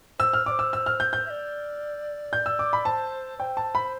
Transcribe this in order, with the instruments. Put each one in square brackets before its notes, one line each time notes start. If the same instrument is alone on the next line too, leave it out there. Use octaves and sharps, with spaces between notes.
[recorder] C5 [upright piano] E6
[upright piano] F6
[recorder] D5 [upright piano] D6
[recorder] C5
[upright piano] E6
E6
F6
G6
G6
[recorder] E5
D5
[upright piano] G6
E6
D6
B5
[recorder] C5 [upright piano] A5
[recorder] C5 D5 [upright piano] G5
[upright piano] A5
B5